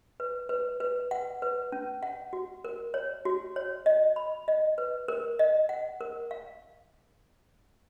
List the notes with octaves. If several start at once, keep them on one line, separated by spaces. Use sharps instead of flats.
B4
B4
B4
F#5
B4
C#4
F#5
F#4
A#4
C#5
F#4
C#5
D#5
B5
D#5
B4
A#4
D#5
F#5
A#4
F5